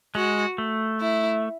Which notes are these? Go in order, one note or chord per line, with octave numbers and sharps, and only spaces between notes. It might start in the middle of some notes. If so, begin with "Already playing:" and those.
G#3 F#4
A3
E4